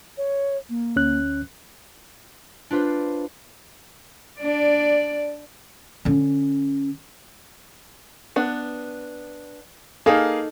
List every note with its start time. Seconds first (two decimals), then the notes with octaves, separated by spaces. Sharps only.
0.17 C#5
0.69 A#3
0.96 D2 C#4 F#6
2.71 D4 F4 B4 C5
4.39 D4 D5
6.05 D3 C#4
8.36 B3 D4
10.06 A#3 D#4 G#4 A4 F5